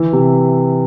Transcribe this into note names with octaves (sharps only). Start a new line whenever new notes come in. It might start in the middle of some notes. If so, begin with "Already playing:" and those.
Already playing: E3
C3